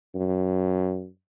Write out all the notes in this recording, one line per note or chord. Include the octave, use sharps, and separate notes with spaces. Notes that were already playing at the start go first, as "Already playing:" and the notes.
F#2